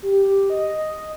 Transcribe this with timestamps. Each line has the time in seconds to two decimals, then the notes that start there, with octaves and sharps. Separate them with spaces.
0.02 G4
0.50 D#5